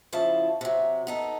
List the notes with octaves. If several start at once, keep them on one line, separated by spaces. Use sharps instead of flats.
C#3 F3 E4 A5
C3 F#3
B3 D#4 A4